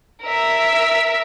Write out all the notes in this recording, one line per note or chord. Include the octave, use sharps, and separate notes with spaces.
A#4 E5